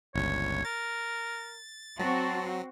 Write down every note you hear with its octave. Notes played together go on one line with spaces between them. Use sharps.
G1 C#2 C#5
A#4 A6
F#3 C4 F#4 A5